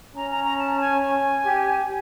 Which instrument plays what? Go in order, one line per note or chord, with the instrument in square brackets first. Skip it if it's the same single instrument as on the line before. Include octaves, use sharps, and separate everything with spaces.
[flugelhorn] C#4 [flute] A#5
[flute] A#5
A#5
A5
G#5
G#5
[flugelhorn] G4